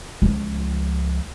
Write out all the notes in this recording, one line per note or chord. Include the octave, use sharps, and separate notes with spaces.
C#2 F3